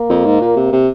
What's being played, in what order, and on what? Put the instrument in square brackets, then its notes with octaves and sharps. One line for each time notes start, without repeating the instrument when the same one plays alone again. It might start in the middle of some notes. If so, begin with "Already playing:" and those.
Already playing: [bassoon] A#3
[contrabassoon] F2
G#2
A#2
C3
C3